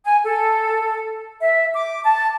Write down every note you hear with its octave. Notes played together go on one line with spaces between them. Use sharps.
G#5
A4
E5
D6
A5